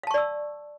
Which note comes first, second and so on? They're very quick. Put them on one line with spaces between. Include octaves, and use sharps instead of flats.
F5 A5 C#6 D5 E6